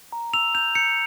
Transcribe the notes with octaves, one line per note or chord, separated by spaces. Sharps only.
A#5
E6 F7
G6 F7
G6 C#7